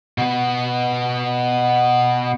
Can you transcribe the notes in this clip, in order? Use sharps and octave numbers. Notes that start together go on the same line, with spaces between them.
B2 B3